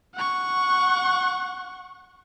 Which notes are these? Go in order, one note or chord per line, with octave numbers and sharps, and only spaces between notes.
F#5 C#6